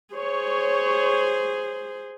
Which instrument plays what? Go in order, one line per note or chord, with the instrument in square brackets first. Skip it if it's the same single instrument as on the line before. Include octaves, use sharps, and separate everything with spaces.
[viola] G#4 C5 [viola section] C#5